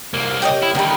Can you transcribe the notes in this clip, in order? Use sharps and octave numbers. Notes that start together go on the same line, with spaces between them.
C2 A#3
G4 C#5 D#5
E4
D#2 D3 D#3 G3